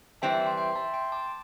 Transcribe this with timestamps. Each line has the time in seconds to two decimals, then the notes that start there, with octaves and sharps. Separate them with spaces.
0.22 E3 G3 C4 E5 A5
0.34 E5 A5
0.46 G5 C6
0.57 G5 C6
0.75 E5 A5
0.94 G5 C6
1.12 A5 D6